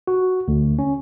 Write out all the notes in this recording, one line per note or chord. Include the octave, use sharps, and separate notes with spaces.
F#4
D2
C#4